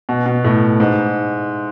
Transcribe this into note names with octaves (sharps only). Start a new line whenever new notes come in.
B2
B2
A2
G#2